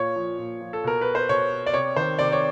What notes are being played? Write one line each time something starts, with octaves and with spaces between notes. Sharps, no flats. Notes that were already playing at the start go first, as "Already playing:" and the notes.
Already playing: A#2 C#5
F3
A#2
F3
A4
B2 A#4
B4
C5
B2 C#5
D5
C3 C#5
D#3 C5
C3 D5
C#5